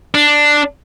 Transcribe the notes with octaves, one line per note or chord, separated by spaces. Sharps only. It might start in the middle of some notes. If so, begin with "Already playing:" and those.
D4